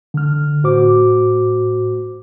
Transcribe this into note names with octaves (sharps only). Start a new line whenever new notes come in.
D3 F6
A2 F#4 C5 D6